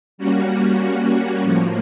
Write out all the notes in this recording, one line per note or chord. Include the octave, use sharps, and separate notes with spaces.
G3 A#3 C#4 F#4
A2 F3 A#3